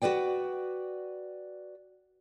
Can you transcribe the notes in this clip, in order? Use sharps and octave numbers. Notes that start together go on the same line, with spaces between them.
F#4 A#4 B4 D5 G5